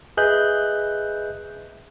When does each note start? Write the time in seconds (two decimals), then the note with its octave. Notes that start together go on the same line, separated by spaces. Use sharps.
0.17 G#4 B4 D#5 E5 F#6 G6